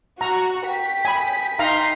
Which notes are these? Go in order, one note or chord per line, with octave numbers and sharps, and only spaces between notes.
F#4 A#5
G5 B6
G#5 B5
D#4 F5 A#5 C6